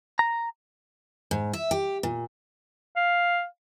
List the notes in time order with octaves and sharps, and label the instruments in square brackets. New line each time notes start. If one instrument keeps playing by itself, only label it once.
[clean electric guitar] A#5
[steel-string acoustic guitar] G#2
E5
G4
A#2
[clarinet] F5